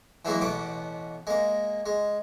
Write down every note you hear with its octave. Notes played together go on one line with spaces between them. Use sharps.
E3 F#3 G#3 A#3 E4
A1 B2 F#5 D6
G#3 A#3
G#3